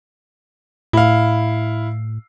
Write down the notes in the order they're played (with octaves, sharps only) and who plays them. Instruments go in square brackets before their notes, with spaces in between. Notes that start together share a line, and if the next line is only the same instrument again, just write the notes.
[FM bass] A2 [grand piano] E4 F5